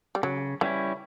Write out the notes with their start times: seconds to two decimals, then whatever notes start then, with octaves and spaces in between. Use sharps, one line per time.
0.15 G3
0.23 C#3 F#3
0.61 E3 G3 C#4 E4